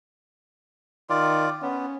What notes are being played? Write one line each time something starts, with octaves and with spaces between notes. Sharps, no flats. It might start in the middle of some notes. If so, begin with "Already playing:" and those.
D#3 F4 D5
B3 C#4